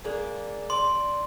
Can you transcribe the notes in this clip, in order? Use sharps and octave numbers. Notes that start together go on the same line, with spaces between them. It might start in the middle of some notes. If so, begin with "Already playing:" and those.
G#3 A#3 D4
D5 C6